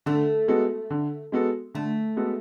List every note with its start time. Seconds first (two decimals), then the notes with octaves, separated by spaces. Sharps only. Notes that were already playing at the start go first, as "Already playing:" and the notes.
0.06 D3 A3
0.48 G#3 B3 F#4 A4
0.90 D3
1.32 G#3 B3 F#4 A4
1.74 D3 A3
2.16 G#3 B3 F#4 A4